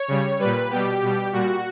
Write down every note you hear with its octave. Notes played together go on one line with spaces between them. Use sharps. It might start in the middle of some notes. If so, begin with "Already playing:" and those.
Already playing: C#5
C#3 G3
A#2 G3 B4
B2 G3 G4
B2 G3
A#2 G3 F#4